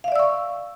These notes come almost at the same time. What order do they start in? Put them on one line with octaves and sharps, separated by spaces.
F5 E5 D5 E6 C#6